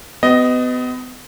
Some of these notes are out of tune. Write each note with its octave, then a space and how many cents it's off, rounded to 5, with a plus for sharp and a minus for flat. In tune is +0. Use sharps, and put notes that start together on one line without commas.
B3 +30 G4 -30 D#5 +0